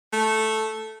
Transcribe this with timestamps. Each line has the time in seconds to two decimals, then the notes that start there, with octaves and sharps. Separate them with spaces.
0.13 A3